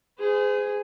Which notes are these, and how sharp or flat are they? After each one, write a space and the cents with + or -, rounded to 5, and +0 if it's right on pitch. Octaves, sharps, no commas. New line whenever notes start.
G#4 +0 C5 -40